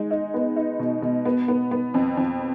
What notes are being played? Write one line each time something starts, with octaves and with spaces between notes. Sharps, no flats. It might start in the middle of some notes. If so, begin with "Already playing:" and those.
Already playing: G#3 D#4
D#4
B3
D#4
B2
B2
B3
B3
B3
F2
F2